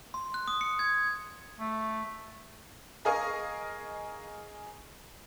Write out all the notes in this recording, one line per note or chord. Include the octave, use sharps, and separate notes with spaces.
C6
F#6
D#6
C#7
G#6
A3
G#4 A#4 D#5 F5 G#5 C#6